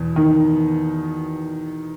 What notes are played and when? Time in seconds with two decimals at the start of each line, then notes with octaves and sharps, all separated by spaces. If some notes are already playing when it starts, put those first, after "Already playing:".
Already playing: E2 B2
0.16 D#3